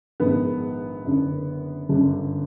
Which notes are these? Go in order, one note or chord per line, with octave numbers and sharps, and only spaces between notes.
A#1 G#2 D#3 B3
F#1 F#2 D3
G1 F#2 D3